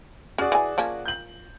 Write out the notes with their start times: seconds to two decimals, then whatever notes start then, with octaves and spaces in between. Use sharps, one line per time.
0.38 C#4 F#4 G#4 D5
0.52 E3 G#5
0.78 F3 A#3 C#4
1.05 G6 F#7